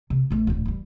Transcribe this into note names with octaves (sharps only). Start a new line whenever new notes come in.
C3
A1 A3
D1 A#1
E3 G3